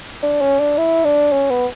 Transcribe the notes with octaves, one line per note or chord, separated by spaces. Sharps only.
D4
C#4
D4
E4
D4
C#4
B3